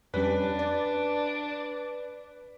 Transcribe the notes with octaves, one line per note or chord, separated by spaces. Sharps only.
F2 G3 C#4 D4 B4
D5